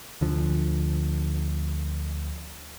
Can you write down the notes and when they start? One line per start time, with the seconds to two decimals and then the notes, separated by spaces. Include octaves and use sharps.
0.21 D2 D3 F3